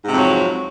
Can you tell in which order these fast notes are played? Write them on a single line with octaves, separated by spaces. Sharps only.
G#2 C3 F2 F#3